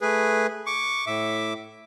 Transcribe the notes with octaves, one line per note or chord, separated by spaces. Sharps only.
A3 G#4 B4
C#6 D6
A2 E5 D6